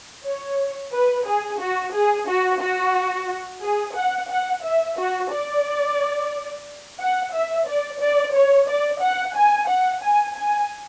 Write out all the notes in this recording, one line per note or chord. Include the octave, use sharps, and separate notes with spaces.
C#5
B4
G#4
F#4
G#4
F#4
F#4
G#4
F#5
F#5
E5
F#4
D5
F#5
E5
D5
D5
C#5
D5
F#5
G#5
F#5
G#5
G#5